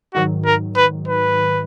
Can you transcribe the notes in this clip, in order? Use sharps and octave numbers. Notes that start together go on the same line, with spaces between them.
G#2 D#3 F#3 F#4
A#4
B4
B4